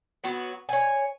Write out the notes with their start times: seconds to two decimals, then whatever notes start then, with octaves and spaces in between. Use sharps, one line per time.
0.24 F#3 B3 F#4
0.69 C#5 G#5